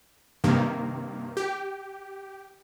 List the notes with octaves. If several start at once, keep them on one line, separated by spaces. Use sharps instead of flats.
G2 C3 D#3 A#3
G4